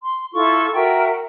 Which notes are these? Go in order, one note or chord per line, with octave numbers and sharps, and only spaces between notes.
C6
E4 F4 A4 C#6
F#4 A#4 E5 G5